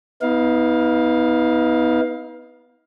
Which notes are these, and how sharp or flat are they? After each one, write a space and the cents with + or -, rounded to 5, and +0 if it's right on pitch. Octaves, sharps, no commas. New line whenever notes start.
B3 +0 D#4 +45 F5 +10